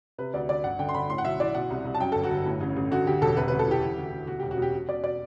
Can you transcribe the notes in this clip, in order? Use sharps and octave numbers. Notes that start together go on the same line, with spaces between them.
C3 B4
D2 D5
D2 D5
G1 F#5
D3 G5
C6
D3 B5
A2 C6
F#5
B1 E5
E3 D5
B2 F#5
C2
C2
A5
F#2 G5
A4
G1
F#4
G1
A2
A1
A1
D3 F#4
D2 G4
E1 A4
C3 B4
B4
D2
A4
E3 G4
E3
D2
D2
B2 F#4
G4
E1
F#4
B2 G4
B2
B2 D5
B2 D5